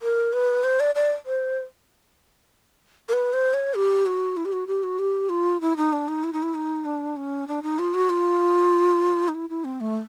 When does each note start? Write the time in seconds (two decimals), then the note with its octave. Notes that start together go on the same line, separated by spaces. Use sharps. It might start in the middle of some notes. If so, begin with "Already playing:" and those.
0.02 A#4
0.33 B4
0.64 C5
0.80 D5
0.95 D5
1.26 C5
3.09 A#4
3.13 B4
3.33 C5
3.54 C#5
3.75 G4
4.06 F#4
4.37 E4
4.45 G4
4.53 F#4
4.67 G4
4.83 F#4
4.99 G4
5.29 F4
5.61 E4
5.77 D#4
5.93 D4
6.08 D#4
6.24 E4
6.33 D#4
6.43 E4
6.55 D#4
6.85 D4
7.17 C#4
7.48 D4
7.63 D#4
7.79 F4
7.94 F#4
8.10 F4
9.28 D#4
9.34 E4
9.50 E4
9.65 C4
9.81 A3